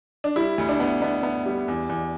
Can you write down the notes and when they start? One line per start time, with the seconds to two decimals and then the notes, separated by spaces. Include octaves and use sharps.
0.24 D4
0.36 G3 E4
0.58 D2
0.69 D4
0.80 B3
1.02 B3 D4
1.23 B3
1.46 G3
1.68 E2
1.89 E2